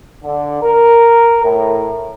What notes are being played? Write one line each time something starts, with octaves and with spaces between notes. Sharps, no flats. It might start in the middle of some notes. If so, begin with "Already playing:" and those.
D3
A#4
A2